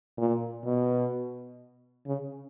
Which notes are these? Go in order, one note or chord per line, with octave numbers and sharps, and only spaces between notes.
A#2
B2
C#3